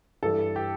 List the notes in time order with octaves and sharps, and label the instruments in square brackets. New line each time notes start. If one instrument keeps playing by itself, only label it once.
[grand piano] G2 E3 G3 A4
G4